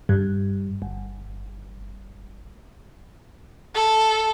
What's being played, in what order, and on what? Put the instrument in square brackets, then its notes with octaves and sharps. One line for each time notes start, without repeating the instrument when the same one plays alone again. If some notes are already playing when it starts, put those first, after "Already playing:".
[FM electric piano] G2
G1
[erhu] A4